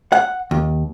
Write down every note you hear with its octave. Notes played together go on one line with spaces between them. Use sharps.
F#5
D#2